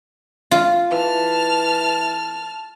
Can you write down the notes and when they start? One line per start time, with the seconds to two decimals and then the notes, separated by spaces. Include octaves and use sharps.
0.51 F4
0.92 E3 A5 F6